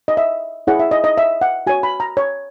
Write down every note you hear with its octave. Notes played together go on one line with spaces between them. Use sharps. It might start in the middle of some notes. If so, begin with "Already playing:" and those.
D#5
E5
E4 G#4 C#5 F#5
E5
D#5
D#5
E5
F#5
F#4 C#5 G#5
B5
A#5
C#5